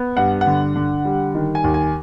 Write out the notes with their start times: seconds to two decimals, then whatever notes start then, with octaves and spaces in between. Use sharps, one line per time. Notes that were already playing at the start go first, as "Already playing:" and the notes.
Already playing: B3
0.17 G2 F#5
0.41 F#5
0.47 D3
0.76 D3
1.05 G3
1.35 D#3
1.55 G#5
1.64 D#2
1.74 G#5